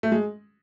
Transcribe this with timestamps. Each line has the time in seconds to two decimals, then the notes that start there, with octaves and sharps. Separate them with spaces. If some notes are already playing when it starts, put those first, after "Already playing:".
0.03 A3
0.12 G#3